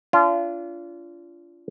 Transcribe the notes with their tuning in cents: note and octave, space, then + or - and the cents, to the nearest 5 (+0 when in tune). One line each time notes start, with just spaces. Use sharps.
D4 -40 F4 -25